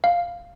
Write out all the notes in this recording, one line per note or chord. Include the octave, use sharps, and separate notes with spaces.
F5